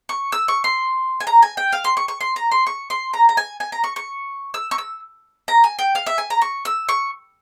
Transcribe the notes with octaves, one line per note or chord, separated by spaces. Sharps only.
C#6
E6
C#6
C6
G#5
A#5
G#5
G5
F5
C6
C#6
C#6
C6
A#5
C6
C#6
C6
A#5
A#5
G#5
G#5
A#5
C#6
C#6
E6
C#6
E6
A#5
G#5
G5
F5
E5
G#5
A#5
C#6
E6
C#6